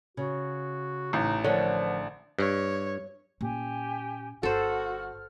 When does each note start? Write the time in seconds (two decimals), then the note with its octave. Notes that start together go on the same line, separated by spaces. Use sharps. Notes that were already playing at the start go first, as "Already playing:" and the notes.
0.17 C#3 F#4
1.13 A1 D#4
1.44 D3 F3 A#4 C#5
2.39 G2 C#5
3.41 A#2 C#4 G4 G#5
4.43 G1 F#4 A4 C5 F6